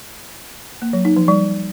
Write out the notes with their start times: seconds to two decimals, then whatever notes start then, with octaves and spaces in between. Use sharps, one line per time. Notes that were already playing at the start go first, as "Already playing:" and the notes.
0.82 A#3
0.93 F#3
1.05 D#4
1.17 F3
1.28 G3